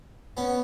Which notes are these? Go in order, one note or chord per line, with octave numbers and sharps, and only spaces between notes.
B3 C#4